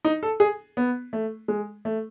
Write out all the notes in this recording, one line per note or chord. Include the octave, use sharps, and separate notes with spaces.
D#4
A4
G#4
B3
A3
G#3
A3